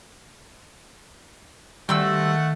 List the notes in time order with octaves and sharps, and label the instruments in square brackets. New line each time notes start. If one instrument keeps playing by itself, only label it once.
[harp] D#3 [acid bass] G3 [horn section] A3 F#5 [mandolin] C4 F#4 E6